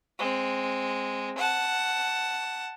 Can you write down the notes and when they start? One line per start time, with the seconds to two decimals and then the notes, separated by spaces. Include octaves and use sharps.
0.19 G#3 C4
1.37 F#5 A5